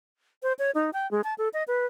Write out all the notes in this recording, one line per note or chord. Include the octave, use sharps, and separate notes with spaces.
C5
C#5
D#4
G5
G#3
A5
A4
D#5
B4